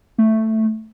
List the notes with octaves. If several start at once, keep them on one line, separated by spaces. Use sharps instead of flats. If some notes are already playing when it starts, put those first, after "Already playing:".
A3